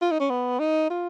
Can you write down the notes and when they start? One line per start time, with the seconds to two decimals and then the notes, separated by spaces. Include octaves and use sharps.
0.02 F4
0.11 D#4
0.20 C#4
0.30 B3
0.59 D#4
0.90 F4